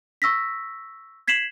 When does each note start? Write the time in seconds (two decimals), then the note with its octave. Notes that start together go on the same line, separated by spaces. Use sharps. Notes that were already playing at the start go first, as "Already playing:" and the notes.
0.22 C#6 E6 A#6 B6
1.28 G#6 B6 C7 E7 F#7